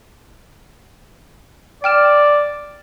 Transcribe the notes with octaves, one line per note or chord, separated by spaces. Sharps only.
D5 G5 F6 E7